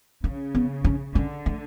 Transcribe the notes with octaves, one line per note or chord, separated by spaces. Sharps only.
C#3 C#4
B3
C#4
D3 C#4
A3